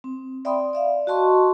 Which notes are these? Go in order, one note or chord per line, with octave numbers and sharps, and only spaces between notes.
C4
D5 E5 G5 B5 C6 D#6
D5 E5 F5
F#4 D#5 A5 C6 C#6